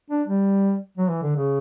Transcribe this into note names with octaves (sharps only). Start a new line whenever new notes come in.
D4
G3
F#3
E3
D3
C#3